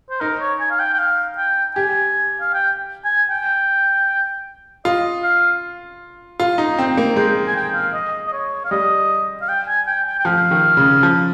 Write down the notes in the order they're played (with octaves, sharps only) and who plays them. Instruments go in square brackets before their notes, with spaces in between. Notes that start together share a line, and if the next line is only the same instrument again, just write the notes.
[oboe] C5
[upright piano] D#4 [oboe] A#4
[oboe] C#5
G#5
F5
G5
G5
F5
G5
[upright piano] G4 [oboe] G#5
[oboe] F5
G5
G#5
G5
[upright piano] F4 [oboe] D#5
[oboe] F5
[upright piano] F4
D#4
C4
A#3
[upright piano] G#3 [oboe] G5
[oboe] G#5
G5
F5
D#5
D#5
C#5
F5
[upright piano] G3 [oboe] D#5
[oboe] F5
G5
G#5
G5
G5
G5
[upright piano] F3 [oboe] F5
[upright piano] D#3
C#3
F3